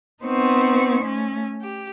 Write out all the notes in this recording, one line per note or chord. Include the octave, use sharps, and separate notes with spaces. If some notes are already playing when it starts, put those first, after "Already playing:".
B3 C4 D#4 C5 C#6
A3 C#4
G4